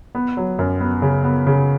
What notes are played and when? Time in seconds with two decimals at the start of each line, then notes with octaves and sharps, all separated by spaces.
0.15 B3
0.37 F#3
0.59 F#2
0.80 B3
1.02 C#3
1.24 B3
1.47 C#3